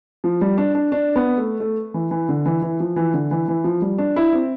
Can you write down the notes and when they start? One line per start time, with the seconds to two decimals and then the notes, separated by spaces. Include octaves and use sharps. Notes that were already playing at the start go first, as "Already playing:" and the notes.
0.24 F3
0.41 G3
0.58 D4
0.75 D4
0.92 D4
1.16 B3
1.38 A3
1.60 A3
1.94 E3
2.11 E3
2.29 D3
2.46 E3
2.62 E3
2.80 F3
2.96 E3
3.14 D3
3.31 E3
3.48 E3
3.64 F3
3.82 G3
3.98 D4
4.16 E4
4.33 C4